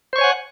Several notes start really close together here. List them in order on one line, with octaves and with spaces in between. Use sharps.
C5 C#6 C#5 G#5 F#5